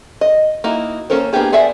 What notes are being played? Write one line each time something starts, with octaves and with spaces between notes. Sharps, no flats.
D#5
A#3 D#4 E4 F#4
A#3 C#4 A4 A#4 C5
A#3 B3 D4 G4 G#4
B3 G#4 D5 E5 F#5